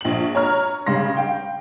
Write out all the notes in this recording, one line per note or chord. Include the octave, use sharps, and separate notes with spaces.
A#1 F#7
C#5 A#5 F6
C#3 G3 C6 A#6
F5 G5